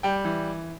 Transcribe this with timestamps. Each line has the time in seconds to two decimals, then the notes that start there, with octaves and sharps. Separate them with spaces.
0.03 G3 G5
0.25 E3